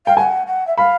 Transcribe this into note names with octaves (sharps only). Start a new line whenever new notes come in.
F5 G5
F#5 G#5
F#5
E5
F5 B5